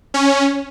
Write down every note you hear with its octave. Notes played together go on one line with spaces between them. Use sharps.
C#4